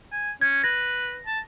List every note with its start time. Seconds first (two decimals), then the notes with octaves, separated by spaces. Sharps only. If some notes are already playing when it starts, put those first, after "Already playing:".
0.12 G#5
0.41 C#4 G#6
0.63 B4 A#6
1.26 A5